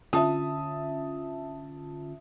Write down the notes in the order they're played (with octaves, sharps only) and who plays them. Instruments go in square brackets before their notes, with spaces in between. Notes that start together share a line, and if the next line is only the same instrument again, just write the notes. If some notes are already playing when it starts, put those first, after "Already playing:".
[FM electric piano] D3 C#4 F4 [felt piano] E5 A5 D#6